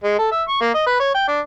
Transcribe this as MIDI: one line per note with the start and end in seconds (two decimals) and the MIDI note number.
0.04 0.15 56
0.19 0.28 69
0.32 0.43 76
0.48 0.59 85
0.61 0.70 58
0.74 0.85 75
0.86 0.97 71
1.00 1.11 73
1.15 1.27 79
1.28 1.40 62